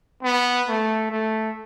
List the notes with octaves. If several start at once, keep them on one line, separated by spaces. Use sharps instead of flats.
B3
A3
A3